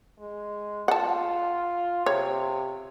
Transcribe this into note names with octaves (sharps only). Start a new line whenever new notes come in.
G#3
F4 F#5 A5
C3 C#5